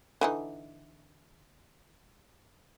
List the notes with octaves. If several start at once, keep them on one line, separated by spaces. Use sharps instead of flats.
D3 E3 D#4